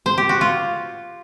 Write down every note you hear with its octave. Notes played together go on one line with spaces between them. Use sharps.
C5
G4
F#4
F4